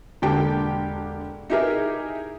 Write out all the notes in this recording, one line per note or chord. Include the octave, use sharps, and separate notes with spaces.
E1 D3 A#3 G4 G5 A5
D#4 E4 G4 G#4 A#4 E5